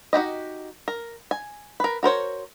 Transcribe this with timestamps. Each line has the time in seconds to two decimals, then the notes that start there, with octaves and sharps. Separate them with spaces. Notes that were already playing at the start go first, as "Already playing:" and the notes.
0.13 D#4 F#4 G4 D#5
0.88 A#4
1.31 G#5
1.80 A#4 B4
2.03 F#4 A#4 C5 C#5